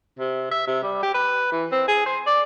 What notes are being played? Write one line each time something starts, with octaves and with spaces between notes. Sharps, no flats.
C3
E5
C3
G3
G4
B4
E3
C4
G#4
C5
D5